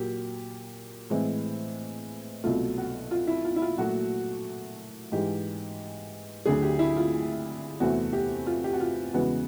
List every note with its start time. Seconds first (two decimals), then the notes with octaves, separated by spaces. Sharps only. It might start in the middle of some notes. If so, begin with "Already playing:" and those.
Already playing: A#2 F#3 A#3 G4
1.10 A2 E3 G#3 C4
2.44 C2 B2 F#3 A3 F4
2.78 F#4
3.11 F4
3.27 E4
3.45 F4
3.56 E4
3.62 F4
3.78 A#2 F#3 A3 F#4
5.12 G#2 E3 G#3 G4
6.46 D2 D3 F#3 G#4
6.62 G4
6.79 E4
6.97 F4
7.80 E2 C3 E3 A3 C4 F#4
8.13 G4
8.47 F4
8.64 G4
8.73 F#4
8.81 F4
9.14 E2 C#3 E3 G#3 B3 F#4